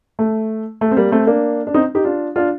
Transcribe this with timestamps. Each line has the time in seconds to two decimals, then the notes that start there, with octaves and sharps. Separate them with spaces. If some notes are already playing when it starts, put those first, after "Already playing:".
0.19 A3
0.81 A3
0.91 C4
0.97 G3 A#3
1.12 A3 C4
1.27 A#3 D4
1.67 D4
1.74 C4 D#4
1.95 D#4 G4
2.04 D4 F4
2.36 D4 F4